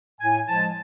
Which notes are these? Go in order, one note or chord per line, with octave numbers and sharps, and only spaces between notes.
A2 G#5
F3 G#3 A5